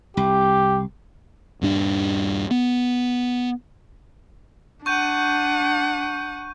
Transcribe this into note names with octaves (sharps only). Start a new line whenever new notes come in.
C2 G4
D#1 G2 D4
B3
D4 F#5 C#6 G6 D#7